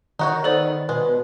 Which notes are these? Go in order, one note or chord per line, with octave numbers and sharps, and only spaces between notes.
D#3 D#4 F#4 C#5
B3 A4 C5 D5
B2 G#3 B4